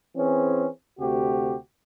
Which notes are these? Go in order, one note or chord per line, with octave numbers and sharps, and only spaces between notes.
E3 C4 C#4 G#4
D2 C3 F#4 G4